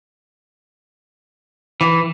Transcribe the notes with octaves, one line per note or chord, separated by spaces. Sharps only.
E3